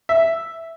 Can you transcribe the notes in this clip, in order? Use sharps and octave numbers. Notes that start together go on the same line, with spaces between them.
E5